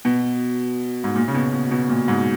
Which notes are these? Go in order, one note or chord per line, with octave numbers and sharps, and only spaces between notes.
B2
G#2
A#2
C#3
B2
B2
B2
A#2
G#2